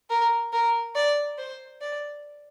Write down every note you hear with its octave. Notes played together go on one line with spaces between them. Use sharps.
A#4
A#4
D5
C5
D5